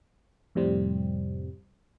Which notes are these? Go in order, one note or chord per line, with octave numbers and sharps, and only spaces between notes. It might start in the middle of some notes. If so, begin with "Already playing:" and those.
F2 A2 C3 G3 C4